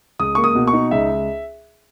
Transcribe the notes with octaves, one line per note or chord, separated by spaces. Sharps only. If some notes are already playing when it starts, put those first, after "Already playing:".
C#2 D#6
A#3 C#6
D#6
B2
C#6
D#4
C#2 E5